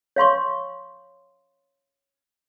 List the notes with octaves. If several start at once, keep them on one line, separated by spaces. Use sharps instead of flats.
C#5 F5 C6 C#6